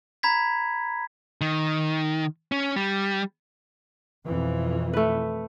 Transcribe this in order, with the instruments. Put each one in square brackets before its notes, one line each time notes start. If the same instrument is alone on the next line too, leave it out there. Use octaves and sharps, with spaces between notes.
[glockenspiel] A#5 B5 G#6 B6
[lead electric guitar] D#3
C#4
G3
[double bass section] F2 B2 E3
[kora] A3 B4